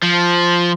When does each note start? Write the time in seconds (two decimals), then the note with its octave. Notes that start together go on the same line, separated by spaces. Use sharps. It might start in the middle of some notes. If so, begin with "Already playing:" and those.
0.03 F3